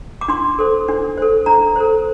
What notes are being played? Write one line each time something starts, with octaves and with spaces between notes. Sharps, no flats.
D6
D4 C6
A4 C5
D4
A4 C5
D4 A#5
A4 C5